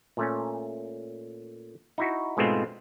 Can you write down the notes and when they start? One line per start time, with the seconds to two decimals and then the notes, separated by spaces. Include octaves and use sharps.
0.17 A#2 A3 C#4
1.98 D#4 E4 F#4
2.37 G#2 B2 G#3 A3 C4 F4